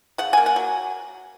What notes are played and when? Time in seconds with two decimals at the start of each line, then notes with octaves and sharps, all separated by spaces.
0.18 C#3 F#5
0.33 A#3 G#5
0.46 F#5
0.56 F#3